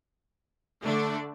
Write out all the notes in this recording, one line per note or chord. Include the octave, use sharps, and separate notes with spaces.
D3 A3 D4